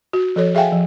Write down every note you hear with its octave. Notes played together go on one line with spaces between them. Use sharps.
F#4
F3 A4 C#5
G#4 E5 F5 G5 G#5
F3